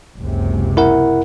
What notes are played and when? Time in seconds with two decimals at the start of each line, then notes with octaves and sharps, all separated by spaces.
0.18 F#1 C#2 C3
0.77 E4 A#4 F#5